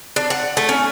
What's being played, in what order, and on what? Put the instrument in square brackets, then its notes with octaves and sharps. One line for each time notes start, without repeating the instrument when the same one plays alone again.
[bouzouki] D4
F#5
A3
C#4